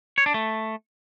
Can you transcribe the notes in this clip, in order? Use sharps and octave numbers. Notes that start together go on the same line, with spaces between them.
C#5
D4
A3